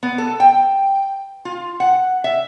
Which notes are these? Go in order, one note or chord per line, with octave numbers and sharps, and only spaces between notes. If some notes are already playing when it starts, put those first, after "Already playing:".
B3
A4
G5
F4
F#5
E5